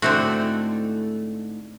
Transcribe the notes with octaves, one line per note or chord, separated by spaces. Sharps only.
G#2 D3 A3 C4 E4 F#4